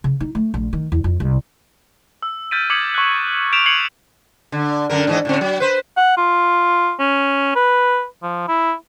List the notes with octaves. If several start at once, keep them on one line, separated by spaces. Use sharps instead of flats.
C#3
D#4
A3
A#1
D#3
E2
F2
C2
E6
F6 G6 A6 B6 D7 D#7
D6 D#6 G#6 B6 C#7 F#7
C#6 F#6
F6 G6 B6 D7 E7 F7
G#6 C7 C#7 D#7 F#7
D3
F#2 D3 A#4
G#2 E3 D#5
A2 D3 C4
F#3
B4 C5
F#5
F4
C#4
B4
F3
E4